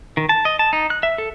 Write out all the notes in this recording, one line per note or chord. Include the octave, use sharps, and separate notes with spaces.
D#3
A5
D#5
A5
D#4
F#6
E5
A4